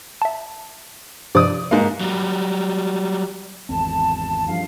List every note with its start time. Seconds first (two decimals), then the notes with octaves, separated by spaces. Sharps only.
0.22 E5 A5
1.35 G2 C3 F3 D5 D#6
1.71 G#2 A#3
2.00 F#3 G3
3.69 G#1 E2 C4 A5
4.48 G2 F3 F5